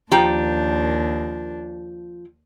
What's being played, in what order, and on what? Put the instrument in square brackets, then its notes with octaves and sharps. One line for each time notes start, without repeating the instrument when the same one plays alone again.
[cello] D#2 D4 [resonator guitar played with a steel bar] F3 G4 A#5